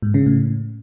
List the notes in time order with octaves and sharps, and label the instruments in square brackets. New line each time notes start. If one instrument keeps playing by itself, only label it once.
[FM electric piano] G#2
C#3
A2